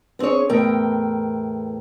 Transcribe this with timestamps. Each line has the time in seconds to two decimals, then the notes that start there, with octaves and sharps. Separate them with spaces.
0.19 B3 C4 D4 G#4 C#5
0.49 E2 A2 A#4 G5